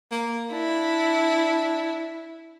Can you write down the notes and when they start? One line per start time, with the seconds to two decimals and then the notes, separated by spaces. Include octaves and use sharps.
0.12 A#3
0.53 D4 E4